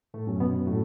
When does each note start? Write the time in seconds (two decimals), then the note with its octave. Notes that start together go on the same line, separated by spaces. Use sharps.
0.14 A2 A3
0.27 F#2
0.40 B2 B3
0.66 A2 F#3 A3